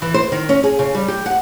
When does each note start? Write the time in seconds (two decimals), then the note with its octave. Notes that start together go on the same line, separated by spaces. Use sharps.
0.02 E3
0.14 C5
0.32 D#3
0.49 C#4
0.64 G#4
0.79 C#3
0.95 G3
1.08 G4
1.26 F#5